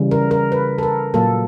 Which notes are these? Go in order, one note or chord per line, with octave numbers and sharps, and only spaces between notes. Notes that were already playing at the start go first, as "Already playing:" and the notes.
Already playing: C#3 E3 G3
A#4
A#4
B4
A4
A#4
A#2 F#3 A#3 A4